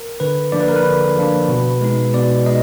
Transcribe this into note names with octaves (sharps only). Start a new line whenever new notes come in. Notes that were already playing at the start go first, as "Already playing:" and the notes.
Already playing: A#4
D3 B4
F3 A#3 D4 D5
B4
A#4
B4
D3
F3 A#3 D4
B2
G#3 D#4
B2 D5
G#3 D#4 D#5